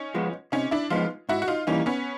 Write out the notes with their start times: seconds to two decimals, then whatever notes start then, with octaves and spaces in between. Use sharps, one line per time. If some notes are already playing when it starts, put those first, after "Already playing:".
Already playing: C#4 D#4
0.14 F3 G#3 B3
0.52 C3 C#4 D#4
0.71 D4 E4
0.90 F3 G#3 B3 D#4 F4
1.29 G#2 E4 F#4
1.42 F#4
1.48 D#4 F4
1.67 E3 G3 A#3 C#4 D#4
1.86 B3 C#4